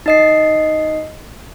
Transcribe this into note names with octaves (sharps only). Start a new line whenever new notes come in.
D#4 D#5 C7